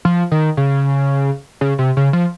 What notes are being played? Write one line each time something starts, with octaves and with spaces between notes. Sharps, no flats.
F3
D#3
C#3
C#3
C3
C#3
F3